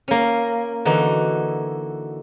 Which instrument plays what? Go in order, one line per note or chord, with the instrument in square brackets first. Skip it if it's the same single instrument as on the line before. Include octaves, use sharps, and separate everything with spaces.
[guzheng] A#3 C#4
D3 E3 D#4 F#4